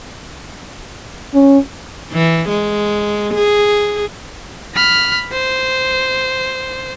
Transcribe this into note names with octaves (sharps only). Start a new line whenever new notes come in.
C#4
E3
G#3
G#4
B5 F6
C5